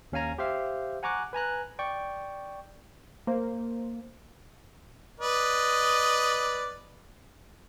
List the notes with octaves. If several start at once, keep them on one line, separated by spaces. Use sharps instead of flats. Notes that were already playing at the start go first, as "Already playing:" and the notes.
D#2 C#4 F5 G#5 A#5
G4 C5 E5 F5
F#5 G#5 A#5 C#6 D6 F#6
B4 G#5 A#5 F#6
D5 G5 C#6
A#3 C5
B4 D5 D#5